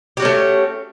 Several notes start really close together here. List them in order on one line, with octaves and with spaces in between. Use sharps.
G4 F#4 C#4 A3